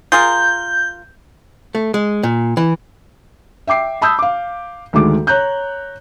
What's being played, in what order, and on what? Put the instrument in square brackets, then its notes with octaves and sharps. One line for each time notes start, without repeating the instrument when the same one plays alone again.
[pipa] F4 G#4 A#4 [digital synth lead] G6
[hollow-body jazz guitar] A3
G#3
A#2
E3
[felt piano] E5 G5 D6 C7
A5 B5 D#6 E6 G6
F5 D6
D2 D#3 G#3 D6
C#5 A#5 F#6 G6